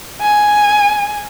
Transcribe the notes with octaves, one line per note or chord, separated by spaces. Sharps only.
G#5